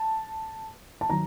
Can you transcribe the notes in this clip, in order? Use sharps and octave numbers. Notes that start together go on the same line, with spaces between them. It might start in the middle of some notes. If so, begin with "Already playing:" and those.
Already playing: A5
A5
D#3 F#3 A#5